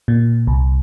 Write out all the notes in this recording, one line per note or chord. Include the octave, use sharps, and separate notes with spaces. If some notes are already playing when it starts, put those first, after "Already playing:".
A#2
C2